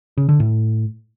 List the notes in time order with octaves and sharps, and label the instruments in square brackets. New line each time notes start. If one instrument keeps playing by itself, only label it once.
[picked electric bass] C#3
D3
A2